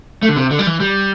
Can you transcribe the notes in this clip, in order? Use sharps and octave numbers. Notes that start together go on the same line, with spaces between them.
A3
D3
C3
D3
G3
E3
G3